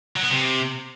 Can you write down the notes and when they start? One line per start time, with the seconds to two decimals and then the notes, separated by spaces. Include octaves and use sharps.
0.16 F#3
0.23 B3
0.30 C3